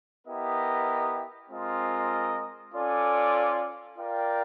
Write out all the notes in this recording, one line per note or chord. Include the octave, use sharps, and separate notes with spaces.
B3 E4 G4 A#4 D#5
G#3 C4 F4 A#4 D#5
C#4 F4 A4 D5
F4 A#4 D5 G5